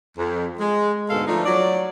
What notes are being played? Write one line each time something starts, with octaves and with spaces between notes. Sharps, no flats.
F2
G#3
D2 G#2 B2 G#3 A4 F5
F3 A3 D4 D#4
F#3 D5